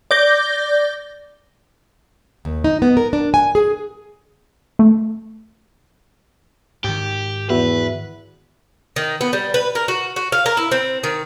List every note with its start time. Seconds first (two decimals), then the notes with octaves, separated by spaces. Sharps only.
0.11 D5 D6 G6 A#6 G7
2.45 D#2
2.64 D#4
2.82 B3
2.97 A#4
3.13 D4
3.34 G#5
3.55 G#4
4.79 A3
6.84 G#2 D#3 G4
7.50 E2 B3 F#4 B4 E5
8.96 D#3
9.21 B3
9.33 G3
9.54 B4
9.75 A#4
9.88 F#4
10.16 F#4
10.32 F5
10.46 A#4
10.57 E4
10.71 C4
11.04 D#3